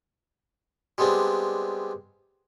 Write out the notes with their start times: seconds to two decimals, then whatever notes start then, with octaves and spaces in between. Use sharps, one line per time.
0.98 G3 G#3 B3 C4 D4